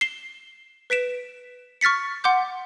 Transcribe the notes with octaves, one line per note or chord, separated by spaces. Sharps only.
C7 E7 G7
B4 B6 D7 E7
C#6 F6 A6 B6 C#7
F#5 C6 D6 G6